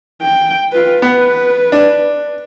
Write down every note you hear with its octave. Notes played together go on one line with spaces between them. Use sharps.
G5
F4 B4
B3 B4
D4